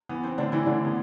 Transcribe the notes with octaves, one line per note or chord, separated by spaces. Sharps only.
E3 B3
C4
A2 D3 D4
E3 E4
A2 D3 D4
B3